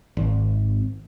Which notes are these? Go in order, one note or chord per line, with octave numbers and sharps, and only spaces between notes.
G#1